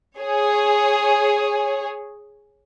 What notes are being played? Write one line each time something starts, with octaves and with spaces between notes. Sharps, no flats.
G#4 C#5